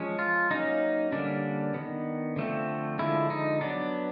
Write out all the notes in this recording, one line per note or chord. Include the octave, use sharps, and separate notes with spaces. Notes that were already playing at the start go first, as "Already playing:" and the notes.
Already playing: F3 G#3 C#4
F4
F#3 A#3 C#4 D#4
D3 G3 A#3 C#4 D4
D#3 G3 B3
D3 F3 A3 C4
D3 F3 G#3 E4
D#4
F#3 B3 D4